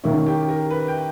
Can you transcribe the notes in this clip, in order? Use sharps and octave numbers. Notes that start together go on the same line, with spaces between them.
D#3 A#3 C#4 E4
G4
A#4
B4
G5